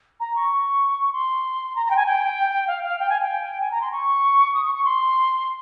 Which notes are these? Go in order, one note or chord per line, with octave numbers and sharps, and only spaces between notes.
A#5
C#6
C6
A#5
A#5
G5
G#5
G5
F5
F5
G5
G#5
G5
G#5
A#5
C6
C#6
D#6
C#6
C#6
C6